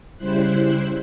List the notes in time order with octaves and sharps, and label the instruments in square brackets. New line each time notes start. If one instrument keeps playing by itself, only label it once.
[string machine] C#3 G3 E4 C5 F#6